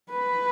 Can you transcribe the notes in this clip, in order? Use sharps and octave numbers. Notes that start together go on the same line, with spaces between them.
B4